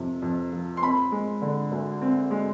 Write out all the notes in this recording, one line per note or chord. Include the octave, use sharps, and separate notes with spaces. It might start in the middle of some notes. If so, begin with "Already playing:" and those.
Already playing: F2 C3 F3
F2
F3
C6
C4 B5
G#3
D3
D2
C4
G#3